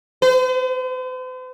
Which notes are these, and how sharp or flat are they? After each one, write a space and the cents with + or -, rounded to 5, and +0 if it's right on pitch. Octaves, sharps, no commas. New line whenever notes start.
C5 -45